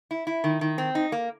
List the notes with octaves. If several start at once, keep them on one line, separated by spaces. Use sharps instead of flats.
E4
E4
D#3
D#3
C4
D#4
A#3